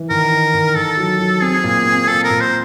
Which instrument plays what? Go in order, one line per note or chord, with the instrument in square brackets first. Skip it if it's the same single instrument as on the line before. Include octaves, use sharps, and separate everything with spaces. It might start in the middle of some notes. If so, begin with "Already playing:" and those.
Already playing: [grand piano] E3
[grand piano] D#3 [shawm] A#4
[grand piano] D#4
D#3
[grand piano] D#3 [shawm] A4
[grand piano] F#3
F#3
[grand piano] C4 [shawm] G#4
[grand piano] A#2
C4
[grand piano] A#2 [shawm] A4
[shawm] A#4
[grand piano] A#2
[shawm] C5